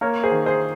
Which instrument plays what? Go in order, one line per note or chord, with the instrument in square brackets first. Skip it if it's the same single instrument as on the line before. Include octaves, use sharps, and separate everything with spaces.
[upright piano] A#3 A#4 C#5
G#4 C5
D#3
G#4 C5